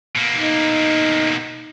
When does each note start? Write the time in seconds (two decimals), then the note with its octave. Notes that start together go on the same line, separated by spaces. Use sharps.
0.16 B2 A#3
0.35 D#4